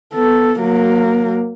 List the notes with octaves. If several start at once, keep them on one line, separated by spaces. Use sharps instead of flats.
B3 A4
F#3 A#3